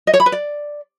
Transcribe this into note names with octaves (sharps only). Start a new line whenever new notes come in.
D#5
C#5
B5
B4
D5